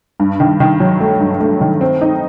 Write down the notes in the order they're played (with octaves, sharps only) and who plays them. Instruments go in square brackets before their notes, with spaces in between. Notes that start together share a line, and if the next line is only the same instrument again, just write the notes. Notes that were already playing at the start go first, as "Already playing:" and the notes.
[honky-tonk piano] G2
D#3
D#3
F#3
A3
G2
A3
D#3
C4
D#4